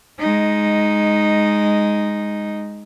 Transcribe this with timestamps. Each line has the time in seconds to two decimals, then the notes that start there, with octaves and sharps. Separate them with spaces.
0.20 G#3 D#4